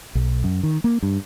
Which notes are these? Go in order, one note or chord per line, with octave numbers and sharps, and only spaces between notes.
B1
F#2
D#3
A#3
G2